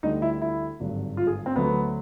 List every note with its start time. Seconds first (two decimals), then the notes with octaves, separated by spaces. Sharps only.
0.03 D2 D3 G3 D#4
0.22 E4
0.42 E4
0.80 G#1 G2 D3 F#3
1.17 F4
1.27 G#4
1.46 C4
1.55 D2 D3 F#3 A3 B3